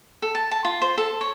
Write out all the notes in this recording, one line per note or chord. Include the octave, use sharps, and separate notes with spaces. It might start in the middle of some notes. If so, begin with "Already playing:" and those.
A4
A5
A5
F4
C5
A4
C#5